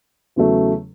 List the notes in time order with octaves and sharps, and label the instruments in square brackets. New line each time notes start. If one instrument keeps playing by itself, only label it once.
[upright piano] E2 C#3 F#3 A3